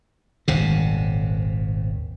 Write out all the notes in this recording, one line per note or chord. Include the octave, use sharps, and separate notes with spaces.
D#1 G#1 C3